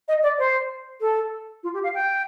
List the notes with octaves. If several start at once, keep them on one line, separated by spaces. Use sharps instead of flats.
D#5
D5
C5
A4
F4
G4
F5
G5